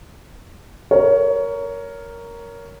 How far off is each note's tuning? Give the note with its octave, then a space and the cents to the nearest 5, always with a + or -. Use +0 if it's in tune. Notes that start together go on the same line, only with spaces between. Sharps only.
A#4 +0 C#5 +20